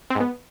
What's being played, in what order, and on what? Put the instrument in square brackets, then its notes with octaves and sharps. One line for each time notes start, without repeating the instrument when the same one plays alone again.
[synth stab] C4
G#2
B3